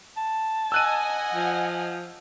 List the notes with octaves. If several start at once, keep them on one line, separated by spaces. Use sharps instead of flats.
A5
D#5 F#5 G#5 E6 F#6 D#7
F3